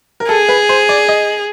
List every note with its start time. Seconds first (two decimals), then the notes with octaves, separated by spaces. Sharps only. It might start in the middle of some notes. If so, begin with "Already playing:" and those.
0.20 A#4
0.29 G#4 A4
0.49 B4
0.69 C5
0.89 D5
1.08 D#5